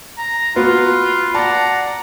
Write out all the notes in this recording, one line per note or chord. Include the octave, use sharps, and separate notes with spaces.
A#5
B3 F4 F#4 B4
D5 F#5 A5 A#5